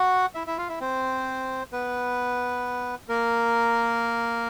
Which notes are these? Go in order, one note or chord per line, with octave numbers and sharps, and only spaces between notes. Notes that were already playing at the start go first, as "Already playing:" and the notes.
Already playing: F#4 F#5
E4 E5
E4 E5
F4 F5
E4 E5
C4 C5
B3 B4
A#3 A#4